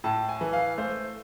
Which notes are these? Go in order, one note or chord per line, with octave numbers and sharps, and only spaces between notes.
A2 A5
G#5
E3
F5
A3 C5